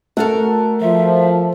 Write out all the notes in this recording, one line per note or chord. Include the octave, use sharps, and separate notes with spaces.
A3 F#4 A4 A#4
F3 E5